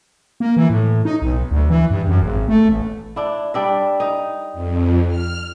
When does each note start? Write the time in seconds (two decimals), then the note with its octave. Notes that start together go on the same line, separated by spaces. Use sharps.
0.40 A#3
0.57 E3
0.70 A2
1.05 D#4
1.22 B1
1.51 D2
1.70 E3
1.90 G2
2.08 F#2
2.22 G#1
2.49 A3
2.69 A1
3.16 D4 E4
3.54 G3 D4 E5
4.00 D#4
4.53 F2
5.08 F6